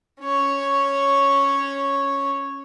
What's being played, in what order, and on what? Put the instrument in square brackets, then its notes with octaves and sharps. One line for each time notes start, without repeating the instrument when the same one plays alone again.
[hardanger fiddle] C#4 C#5